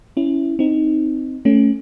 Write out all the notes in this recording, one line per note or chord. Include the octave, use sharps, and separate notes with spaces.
C#4 E4
C4 D#4
A3 C#4